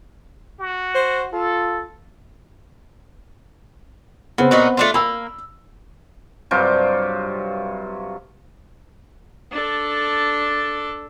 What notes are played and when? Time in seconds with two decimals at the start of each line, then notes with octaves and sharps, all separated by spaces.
0.60 F#4
0.95 C5
1.33 F4 A4
4.38 C#3 B3 C4
4.51 A#2 D#4 F#4
4.77 A3 D4 F4
4.94 A#3 B5 E6
6.51 G2 C3 F#3 F4
9.51 D4 A4